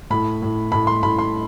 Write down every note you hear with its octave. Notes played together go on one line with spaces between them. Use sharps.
A2 B5
A2
A2 B5
C6
A2 B5
C6